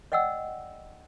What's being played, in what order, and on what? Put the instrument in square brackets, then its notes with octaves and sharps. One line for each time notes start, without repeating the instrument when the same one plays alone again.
[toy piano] D5 D#5 F#5 G5 E6